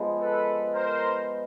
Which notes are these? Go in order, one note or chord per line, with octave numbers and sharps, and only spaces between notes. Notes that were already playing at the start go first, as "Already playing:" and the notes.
Already playing: F3 G#3 B3
A4 B4
A#4 C5